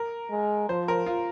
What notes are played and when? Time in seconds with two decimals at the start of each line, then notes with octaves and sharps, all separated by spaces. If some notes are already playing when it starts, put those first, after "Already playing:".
Already playing: A#4
0.31 G#3
0.69 F3 C5
0.88 A#4
1.06 F4